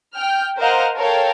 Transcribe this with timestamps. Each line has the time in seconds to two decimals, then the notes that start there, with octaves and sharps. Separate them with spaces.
0.16 G5 F6
0.58 A#4 C5 D#5 F5 F#5
0.97 A4 A#4 C#5 F5 G5